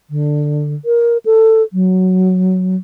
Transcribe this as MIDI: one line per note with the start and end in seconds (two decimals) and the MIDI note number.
0.10 0.74 50
0.85 1.18 70
1.25 1.63 69
1.73 2.76 54